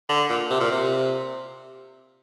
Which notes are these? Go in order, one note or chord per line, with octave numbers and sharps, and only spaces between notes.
D3
A#2
C3
A#2
C3